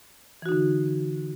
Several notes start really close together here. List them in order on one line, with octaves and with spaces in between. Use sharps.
E3 F#4 D#4 D3